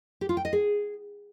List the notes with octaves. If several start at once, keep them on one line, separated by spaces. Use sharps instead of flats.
G4
F4
G5
D#5
G#4